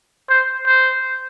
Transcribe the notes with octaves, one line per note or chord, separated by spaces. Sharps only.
C5
C5